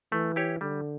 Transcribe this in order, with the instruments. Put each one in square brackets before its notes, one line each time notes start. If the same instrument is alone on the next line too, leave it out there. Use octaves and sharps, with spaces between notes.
[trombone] E3 [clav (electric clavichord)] A3
[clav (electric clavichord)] E4 G4 C#5
[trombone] D3 [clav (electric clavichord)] G3